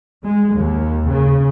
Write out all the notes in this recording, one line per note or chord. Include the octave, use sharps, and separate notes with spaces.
G#3
D#2
C#3